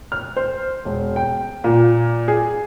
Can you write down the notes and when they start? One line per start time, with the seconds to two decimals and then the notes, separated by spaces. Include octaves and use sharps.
0.12 F6
0.37 C5
0.85 E1
1.16 G5
1.64 A#2
2.28 G#4